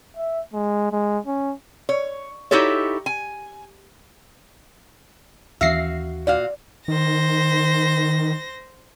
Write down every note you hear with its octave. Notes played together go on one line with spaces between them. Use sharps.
E5
G#3
G#3
C#4
C#5
D#4 E4 F#4 G4 A4 C#5
G#5
D#2 E3 C#4 F#4 E5 F5 A#6 C7
A#2 F#4 D5 F5
D#3 C5 A#6